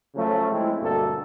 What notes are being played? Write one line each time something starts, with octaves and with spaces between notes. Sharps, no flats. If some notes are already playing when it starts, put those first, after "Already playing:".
C#3 F3 F#3 A3
G#3 C4 E4
D2 G2 B2 A#3 A4